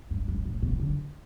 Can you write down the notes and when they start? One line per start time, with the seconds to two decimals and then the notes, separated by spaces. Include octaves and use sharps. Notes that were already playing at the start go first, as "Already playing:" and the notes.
0.11 G2
0.28 G2
0.45 A2
0.62 B2
0.80 D3